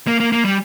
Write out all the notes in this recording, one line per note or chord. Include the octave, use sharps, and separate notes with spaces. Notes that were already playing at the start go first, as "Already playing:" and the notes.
A#3
A#3
A#3
G3